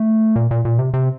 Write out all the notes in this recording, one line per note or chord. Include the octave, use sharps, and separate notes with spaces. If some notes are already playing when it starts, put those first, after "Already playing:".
Already playing: A3
A#2
A#2
A#2
C3
C3